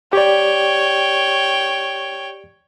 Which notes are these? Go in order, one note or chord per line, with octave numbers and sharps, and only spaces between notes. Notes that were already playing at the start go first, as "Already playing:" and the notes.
G4 C#5 D5 G5